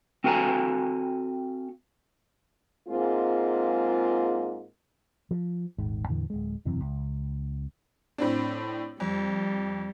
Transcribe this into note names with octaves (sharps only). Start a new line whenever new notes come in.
C4 F#4 A4 F5 G#5 A#5
G#2 G#3 A#3 C4 F4
F3
D#1 G#1 G#2
E2 A2 D3 E3
D1 G#3
E1 F#2 C3 E3
C#2
A2 C4 D4
F2 G3